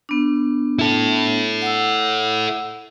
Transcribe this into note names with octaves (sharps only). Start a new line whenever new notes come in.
B3 D4
E4 A4
F#5 E6